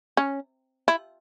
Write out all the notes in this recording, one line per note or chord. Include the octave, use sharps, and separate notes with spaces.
C#4
E4